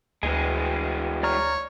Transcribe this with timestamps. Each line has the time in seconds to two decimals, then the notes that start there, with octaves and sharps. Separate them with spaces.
0.23 D2 E3 G#3 G#5
1.23 C#5 D5 A#5 F6